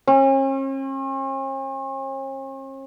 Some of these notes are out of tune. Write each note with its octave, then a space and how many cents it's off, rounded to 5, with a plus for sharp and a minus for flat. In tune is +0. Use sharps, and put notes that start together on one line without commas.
C#4 -45